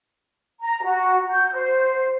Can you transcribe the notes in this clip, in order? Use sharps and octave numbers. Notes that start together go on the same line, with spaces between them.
A#5
F#4
G6
C5